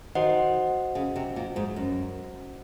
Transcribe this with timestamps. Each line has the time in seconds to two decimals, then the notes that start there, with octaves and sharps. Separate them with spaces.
0.15 D#3 F#4 C5 D#5 F#5
0.95 C#3
1.16 C3
1.36 A#2
1.56 G#2
1.76 F#2